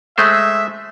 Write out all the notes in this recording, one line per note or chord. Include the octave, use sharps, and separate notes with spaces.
G#3 A3 C5 E5